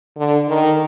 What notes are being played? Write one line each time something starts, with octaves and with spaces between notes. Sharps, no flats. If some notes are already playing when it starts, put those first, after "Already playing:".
D3
D#3